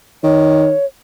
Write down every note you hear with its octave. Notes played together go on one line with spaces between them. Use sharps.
D#3 C#5